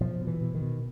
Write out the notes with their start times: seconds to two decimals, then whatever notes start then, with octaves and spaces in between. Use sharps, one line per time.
0.01 B2 F3
0.21 B2
0.27 E3
0.41 B2
0.55 D#3
0.62 B2